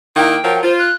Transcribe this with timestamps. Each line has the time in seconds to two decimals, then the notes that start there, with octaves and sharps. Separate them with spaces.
0.16 D#3 A#3 E4 G5
0.44 F3 F#3 A#4
0.63 F4 C5
0.78 F#6